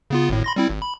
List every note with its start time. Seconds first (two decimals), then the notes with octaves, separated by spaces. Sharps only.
0.10 C#3 B3 F4
0.30 G#1 A2
0.44 B5 C6 A#6
0.56 G3 C4 E4
0.69 G#1
0.82 B5